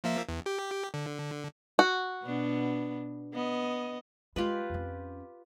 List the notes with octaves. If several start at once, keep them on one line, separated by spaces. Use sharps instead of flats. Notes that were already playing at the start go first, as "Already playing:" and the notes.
F3 A#3 E5
E2
G4
D3
F#4
B2 B3 D4
B3 D#5
G#3 F4 G4 B4
F2 C#4